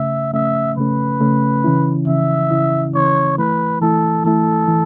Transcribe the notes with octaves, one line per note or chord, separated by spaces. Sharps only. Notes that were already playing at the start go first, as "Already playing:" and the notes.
Already playing: C#3 A3 C#4 E5
C#3 A3 C#4 E5
C#3 A3 C#4 B4
C#3 A3 C#4
C#3 E3 C#4 E4
C#3 E3 C#4 E4 E5
C#3 E3 C#4 E4
C#3 E3 C#4 E4 C#5
E3 A3 E4 B4
E3 A3 E4 A4
E3 A3 E4 A4
E3